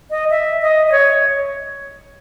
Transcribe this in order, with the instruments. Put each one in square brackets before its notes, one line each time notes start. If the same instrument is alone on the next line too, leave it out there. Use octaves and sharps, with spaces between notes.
[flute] D#5
E5
D#5
D#5
C#5